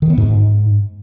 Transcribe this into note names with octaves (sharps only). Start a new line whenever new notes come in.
D#3
B3
G#2